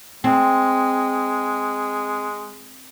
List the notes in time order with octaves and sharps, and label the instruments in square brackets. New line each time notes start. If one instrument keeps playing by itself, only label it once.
[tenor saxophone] G#3 [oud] C4